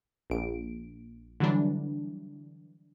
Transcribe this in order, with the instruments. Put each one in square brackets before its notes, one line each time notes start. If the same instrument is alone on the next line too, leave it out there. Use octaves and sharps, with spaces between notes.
[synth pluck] A#1 D7
D3 E3 F#3 G3 D4